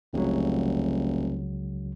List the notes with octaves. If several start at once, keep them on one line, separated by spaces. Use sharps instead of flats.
F1 C#2 C#3 F#3